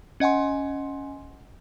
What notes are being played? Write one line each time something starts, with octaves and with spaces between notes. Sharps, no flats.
C#4 D#5 F#5 G#5 C6